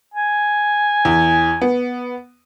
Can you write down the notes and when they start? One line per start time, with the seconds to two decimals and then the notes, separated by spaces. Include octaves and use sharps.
0.14 G#5
1.05 E2
1.62 B3